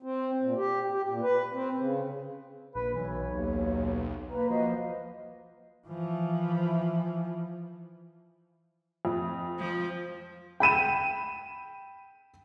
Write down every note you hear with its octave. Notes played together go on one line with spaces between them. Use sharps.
C4
A#2
G4
G4
A#2
B4
C4
C#3
A#1 B4
B1 E3 C#5
D#2
A#3 B4 A#5
F3 F#4 C5 D#5
E3 F3
F2
F3
G5 B5 D#7 E7